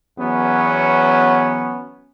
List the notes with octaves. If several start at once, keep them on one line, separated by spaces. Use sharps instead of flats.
E2 F#3 B3 C#4